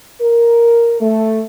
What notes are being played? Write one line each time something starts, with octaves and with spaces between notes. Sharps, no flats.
A#4
A3